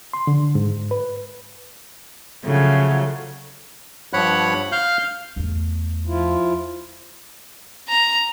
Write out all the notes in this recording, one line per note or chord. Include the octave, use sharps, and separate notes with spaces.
C6
D3
G#2
B4
C#3 F3 F#3 A3
G2 F3 C#5 F#5 B5 F#6
F5 F6 G6
E2 A3
F3 E4 F4
A#5